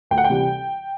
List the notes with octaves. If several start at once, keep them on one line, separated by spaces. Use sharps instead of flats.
D2 G5
F#5
G5
C3 E3 G3